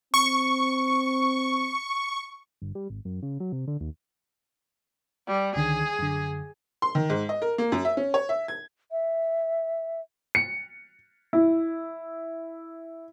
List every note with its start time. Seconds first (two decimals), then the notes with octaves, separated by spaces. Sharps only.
0.14 C4 C#6
2.62 G1
2.75 G3
2.90 G#1
3.05 F#2
3.23 C#3
3.40 F#3
3.52 C3
3.67 D3
3.81 D#2
5.27 G3
5.55 C#2 D3 D#3 G#4
5.99 F#2 D3
6.82 C6
6.95 D#3
7.10 G#2
7.29 D#5
7.42 A#4
7.58 A#3
7.72 F#2
7.85 E5
7.97 C#4
8.14 C#5
8.29 E5
8.48 G#6
8.91 E5
10.35 C#7
11.33 E4